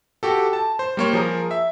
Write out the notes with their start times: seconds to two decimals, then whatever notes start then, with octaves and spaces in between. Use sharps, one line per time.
0.23 F#4 G4 A4
0.53 A5
0.79 C5
0.97 G3 A#3 C#5
1.13 F3 G#4 A#4
1.51 E5